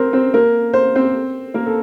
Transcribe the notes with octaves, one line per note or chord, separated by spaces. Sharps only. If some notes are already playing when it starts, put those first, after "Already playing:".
Already playing: C4 A#4 C5
C4 C5
A#3 A#4
C5
C4 C5
A#3 A#4
A4